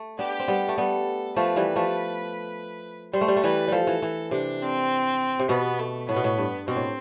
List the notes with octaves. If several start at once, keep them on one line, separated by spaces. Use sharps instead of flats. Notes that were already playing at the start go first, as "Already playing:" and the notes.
Already playing: A3
B3 D4 G4
C4
G3 B3
A3
G3 B3 A4
F3 A3 B4
E3 G3
F3 A3
G3 C5
A3
G3
A3
E3 G3 B4
F3 G3 A4
E3
E3
C3 D4
C4
C3
B2 B3
A3
A2 B3
B2
A2
G2
B2 C4
A2